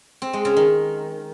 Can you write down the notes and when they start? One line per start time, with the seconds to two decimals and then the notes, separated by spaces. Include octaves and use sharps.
0.22 C4
0.33 G#3
0.45 C#3
0.57 D#3